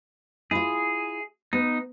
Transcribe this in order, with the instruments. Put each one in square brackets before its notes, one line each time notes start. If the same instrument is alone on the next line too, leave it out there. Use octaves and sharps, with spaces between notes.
[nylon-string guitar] E4 F4 [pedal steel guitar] G#4
[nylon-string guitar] B3 [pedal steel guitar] D#4